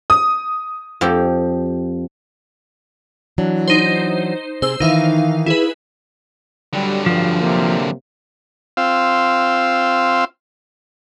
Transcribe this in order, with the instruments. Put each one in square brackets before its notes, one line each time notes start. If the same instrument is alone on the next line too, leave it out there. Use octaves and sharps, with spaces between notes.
[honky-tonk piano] D#6
[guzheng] F2 F3 G4
[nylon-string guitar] E3 F#3 D4
[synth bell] D#4 C5
[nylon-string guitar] C3 C4 G#4 [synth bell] C5 E6
[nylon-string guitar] D#3 E3 E5 [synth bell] D#4 F5
[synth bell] E4 G#4 B4
[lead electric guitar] D3 F#3 [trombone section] G3
[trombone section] G2 [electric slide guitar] F3
[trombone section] C3 A#3
[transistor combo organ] C4 F4 F5 E6